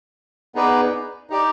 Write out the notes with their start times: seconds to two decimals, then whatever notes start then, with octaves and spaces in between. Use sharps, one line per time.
0.55 B3 D#4 G#4 B4 D5
1.30 D#4 G4 D5